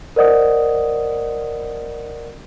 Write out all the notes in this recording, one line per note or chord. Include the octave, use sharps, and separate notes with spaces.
A#4 C5 D5 D#5 F#5 D#6